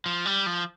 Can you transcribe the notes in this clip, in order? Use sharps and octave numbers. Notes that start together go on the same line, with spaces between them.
F3
G3
F3